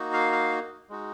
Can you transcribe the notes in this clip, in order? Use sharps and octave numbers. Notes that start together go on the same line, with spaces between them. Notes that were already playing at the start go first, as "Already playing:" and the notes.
Already playing: A#3 D#4 F#4
F5
F5
G#3 D#4 F#4